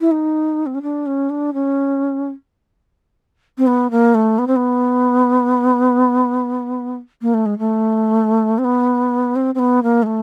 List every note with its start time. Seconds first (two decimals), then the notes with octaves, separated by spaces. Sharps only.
0.01 E4
0.11 D#4
0.66 C4
0.75 C#4
0.82 D4
1.06 C#4
1.30 D4
1.54 C#4
3.58 C4
3.67 B3
3.91 A#3
4.14 A3
4.39 B3
4.47 C4
4.56 B3
7.22 A#3
7.34 A3
7.46 G#3
7.59 A3
8.58 C4
8.65 B3
9.36 C4
9.55 C4
9.59 B3
9.83 A#3
10.03 G#3
10.06 A3